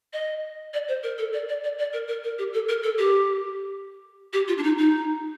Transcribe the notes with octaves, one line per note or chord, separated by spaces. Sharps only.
D#5
D5
C5
A#4
A4
D5
D5
D5
D5
A#4
A#4
A#4
G4
A4
A#4
A4
G4
G4
F4
D4
D#4
D#4